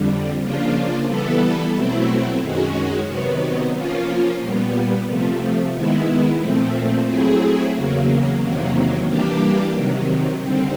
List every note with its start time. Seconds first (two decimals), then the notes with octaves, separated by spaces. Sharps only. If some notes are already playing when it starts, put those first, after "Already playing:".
Already playing: F2 D3 G3
0.41 C#3 F3 A#3 D4 F4
1.07 E3 G3 B3 E4 A4
1.74 B2 F#3 A3 C4 E4
2.41 F#2 D#3 G#3 C#4 F#4
3.07 C3 D#3 F#3 B3
3.75 F3 A#3 C#4 F4
4.40 A#2 G3 B3
5.08 C3 F3 A3
5.73 D#3 G#3 B3 E4
6.40 A#2 F3 A3 C4
7.07 F#3 A3 C4 E4 G#4
7.74 E2 C#3 F#3 A#3
8.40 E2 C3 D#3 F#3 A#3
9.07 E3 G3 A#3 D4 G4
9.73 C3 D#3 F#3
10.40 D#2 D3 G3 C4